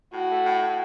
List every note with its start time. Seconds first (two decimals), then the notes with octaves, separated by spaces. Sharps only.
0.13 A2 F#4
0.30 A3
0.46 A2
0.62 A2